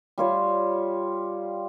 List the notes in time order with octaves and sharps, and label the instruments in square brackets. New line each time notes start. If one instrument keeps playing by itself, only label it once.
[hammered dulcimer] G3 F4 C#5